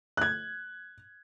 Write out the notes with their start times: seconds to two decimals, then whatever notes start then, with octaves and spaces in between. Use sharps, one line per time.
0.17 F#6 G#6